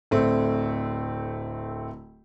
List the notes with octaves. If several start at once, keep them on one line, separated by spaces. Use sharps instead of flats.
D1 A3 C4